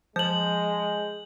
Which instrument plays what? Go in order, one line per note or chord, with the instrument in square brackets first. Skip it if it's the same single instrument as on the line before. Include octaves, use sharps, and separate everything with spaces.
[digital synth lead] F3 [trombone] G#3 [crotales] G6 F#7